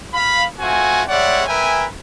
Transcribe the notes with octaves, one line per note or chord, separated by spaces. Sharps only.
F5 B5
A3 C4 F4 F#4 G#5
G3 G#3 C#5 D5 E5 F#5
A#4 B4 E5 G5 G#5